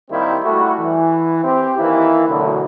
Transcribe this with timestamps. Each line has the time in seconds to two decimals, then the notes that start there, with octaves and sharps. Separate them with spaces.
0.10 D#3 G3 A#3 C4 E4
0.43 G3 A3 E4 F#4
0.79 E3
1.44 C4 G4
1.79 D#3 E3 A#3 E4
2.28 A1 D2 B2 D3 F#3